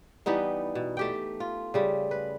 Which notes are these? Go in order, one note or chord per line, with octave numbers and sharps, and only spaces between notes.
E3 G3 B3 D#4
B2
A3 G4 G5
F4
C#3 G3 A3
B4